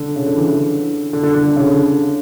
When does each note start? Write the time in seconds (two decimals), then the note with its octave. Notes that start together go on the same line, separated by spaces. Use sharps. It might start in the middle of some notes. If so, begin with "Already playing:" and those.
Already playing: D3
0.16 C#3
0.26 D3
0.37 E3
0.48 D3
1.13 D3
1.23 D3
1.35 D3
1.46 D3
1.56 C#3
1.67 D3